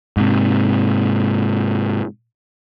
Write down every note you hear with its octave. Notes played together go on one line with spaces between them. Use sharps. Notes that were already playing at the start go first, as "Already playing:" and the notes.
G#2 C3